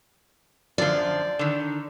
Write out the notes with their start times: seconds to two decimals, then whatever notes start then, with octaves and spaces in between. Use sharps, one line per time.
0.78 F#2 D3 F3 D5
1.39 D3 D#3